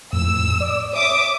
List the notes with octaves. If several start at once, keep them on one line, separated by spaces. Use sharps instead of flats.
F2 A2 E6
D5
C#5 E5 D6 D#6